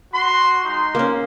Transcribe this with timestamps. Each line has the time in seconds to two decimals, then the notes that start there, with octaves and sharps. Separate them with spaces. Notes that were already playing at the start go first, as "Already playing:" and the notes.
0.12 F#4 C6
0.63 G#3 D#4 C6
0.95 A#3 C#4